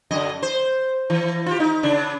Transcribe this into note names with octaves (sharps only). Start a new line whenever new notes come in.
F#2 D3 D#5
C5
E3
F4 G4
D#4
C#3 D4